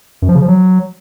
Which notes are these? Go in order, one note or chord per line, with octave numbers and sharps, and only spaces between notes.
F#2
F3
C#3
F3
F#3